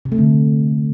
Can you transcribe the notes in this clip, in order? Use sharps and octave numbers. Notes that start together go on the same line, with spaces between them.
C3
A3
D3